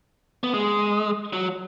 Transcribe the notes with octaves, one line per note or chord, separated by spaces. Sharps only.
B3
G#3
F#3